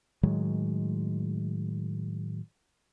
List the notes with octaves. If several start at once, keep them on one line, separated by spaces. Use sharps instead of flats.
A2 D#3 F#3 G#3